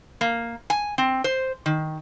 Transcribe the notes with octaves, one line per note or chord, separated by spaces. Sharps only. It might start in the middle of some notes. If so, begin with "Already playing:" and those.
A#3
G#5
C4
C5
D#3